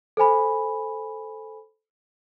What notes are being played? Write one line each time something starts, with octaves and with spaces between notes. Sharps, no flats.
A4 C5 G#5 B5